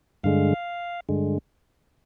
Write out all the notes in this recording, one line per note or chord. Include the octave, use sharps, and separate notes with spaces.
G2 D3 G#3 F5
G2 D3 G#3